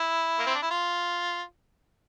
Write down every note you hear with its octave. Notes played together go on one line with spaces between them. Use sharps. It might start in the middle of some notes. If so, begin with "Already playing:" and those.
Already playing: E4
A#3
C4
D4
E4
F4